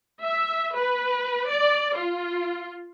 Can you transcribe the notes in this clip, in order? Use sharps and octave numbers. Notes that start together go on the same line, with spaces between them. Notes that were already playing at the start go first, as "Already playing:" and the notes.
E5
B4
D5
F4